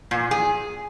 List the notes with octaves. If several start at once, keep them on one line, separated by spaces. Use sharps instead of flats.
A#2
G#4